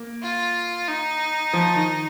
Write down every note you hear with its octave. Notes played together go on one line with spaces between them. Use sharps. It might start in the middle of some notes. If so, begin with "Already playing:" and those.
Already playing: A#3
F4
D#4
F3
D#3